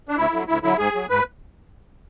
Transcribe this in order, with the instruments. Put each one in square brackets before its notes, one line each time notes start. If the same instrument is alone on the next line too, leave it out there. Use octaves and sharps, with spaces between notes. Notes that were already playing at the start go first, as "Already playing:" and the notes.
[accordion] D4
D2 E4
D3 F#3
D2 E4
D3 F#3 E4
G#2 G#4
F#3
G#2 B4